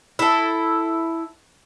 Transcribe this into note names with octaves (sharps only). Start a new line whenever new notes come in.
E4 A4